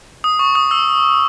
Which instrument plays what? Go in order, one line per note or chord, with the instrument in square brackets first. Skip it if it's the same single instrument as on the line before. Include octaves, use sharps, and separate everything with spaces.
[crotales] D#6
C#6
D#6
E6